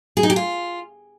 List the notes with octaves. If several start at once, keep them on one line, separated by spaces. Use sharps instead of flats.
G#4
D#4
G4
F4